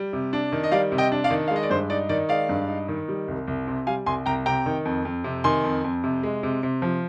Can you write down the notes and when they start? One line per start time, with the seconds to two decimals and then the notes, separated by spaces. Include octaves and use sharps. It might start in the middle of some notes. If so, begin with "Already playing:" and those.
Already playing: G3
0.13 C3
0.33 D4
0.52 D#3
0.64 D#5
0.72 G3 D5 F5
0.92 C3
0.98 D#5 G5
1.12 D4
1.24 D5 F5
1.30 D#3
1.48 F5
1.51 G#3 D#5
1.63 D5
1.70 G2 C5
1.90 D#4 D5
2.09 D#3 D5
2.29 G#3 D5 F5
2.49 G2
2.68 D#4
2.89 D#3
3.08 G3
3.28 C2
3.47 C2
3.67 C3
3.87 G3 F5 G#5
4.06 C2 G#5 C6
4.26 C2 G5 A#5
4.46 C3 G5 A#5
4.66 D#3
4.85 F2
5.05 F2
5.24 C3
5.44 D#3 G#5 C6
5.64 F2
5.84 F2
6.04 C3
6.23 G#3
6.43 C3
6.63 C3
6.82 F3